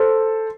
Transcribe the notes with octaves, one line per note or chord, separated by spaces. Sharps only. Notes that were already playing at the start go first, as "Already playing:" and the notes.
Already playing: A4 C5